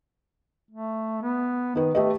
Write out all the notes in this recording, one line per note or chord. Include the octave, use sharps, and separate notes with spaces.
A3
B3
D#3 D#4 B4
A3 G4 B4 D#5